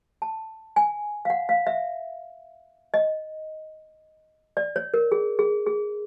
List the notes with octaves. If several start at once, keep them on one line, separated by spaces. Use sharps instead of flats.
A5
G#5
F5
F#5
F5
E5
D#5
D5
C#5
A#4
G#4
G#4
G#4